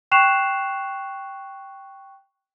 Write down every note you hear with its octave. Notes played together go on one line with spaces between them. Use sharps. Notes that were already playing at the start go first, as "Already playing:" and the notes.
G5 C#6 F#6 C7 E7 F7